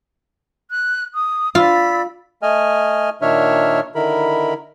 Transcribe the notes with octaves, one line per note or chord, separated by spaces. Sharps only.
F#6
D#6
F4 D5 B5 E6
A3 D#5 G#5 F6
A#2 D#3 D4 C#5 E5 F6
D3 D#3 E4 A#4 B5